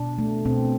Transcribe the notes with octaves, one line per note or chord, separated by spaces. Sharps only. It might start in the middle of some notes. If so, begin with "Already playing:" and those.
Already playing: B2 D4
A3
B2 C4